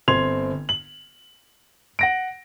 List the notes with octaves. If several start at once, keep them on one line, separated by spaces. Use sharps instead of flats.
G1 C4 C6 G#6 F7
F#7
F#5 A#6 D7